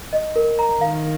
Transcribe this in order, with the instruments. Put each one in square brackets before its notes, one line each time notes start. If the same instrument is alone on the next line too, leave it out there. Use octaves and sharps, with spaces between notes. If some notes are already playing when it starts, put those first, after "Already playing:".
[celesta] D#5
A#4
A#5
[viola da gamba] D#3 [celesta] F5